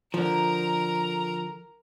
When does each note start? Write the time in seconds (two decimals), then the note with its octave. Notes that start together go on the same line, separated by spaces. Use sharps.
0.14 D3 F3 A#4 A#5